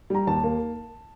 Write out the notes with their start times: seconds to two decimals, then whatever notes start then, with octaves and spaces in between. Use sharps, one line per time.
0.10 G3 A#5
0.27 D#2 A5
0.43 A#3